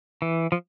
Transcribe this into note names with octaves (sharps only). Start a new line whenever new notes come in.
E3
F3